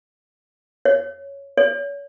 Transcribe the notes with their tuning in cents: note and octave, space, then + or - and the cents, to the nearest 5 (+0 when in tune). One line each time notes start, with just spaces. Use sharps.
C#5 +0
C#5 +35